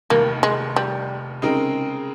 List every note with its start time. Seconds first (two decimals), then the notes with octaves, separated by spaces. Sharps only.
0.10 F1 D#2 D#3 A#3
0.43 G#3
0.76 G3
1.42 C#3 G#3 C4 D#4 A#4